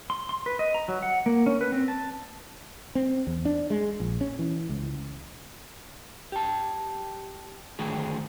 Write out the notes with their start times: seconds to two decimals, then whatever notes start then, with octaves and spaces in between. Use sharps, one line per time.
0.10 C6
0.29 C6
0.46 B4
0.59 D#5
0.74 A#5
0.88 F#3
1.03 F#5
1.26 A#3
1.46 C#4
1.61 B4
1.72 C4
1.88 A5
2.95 C4
3.27 E2
3.45 D4
3.70 G#3
4.00 A#1
4.21 C#4
4.39 E3
4.69 C#2
6.32 G4 A5
7.79 D3 D#3 F#3 A3 G#4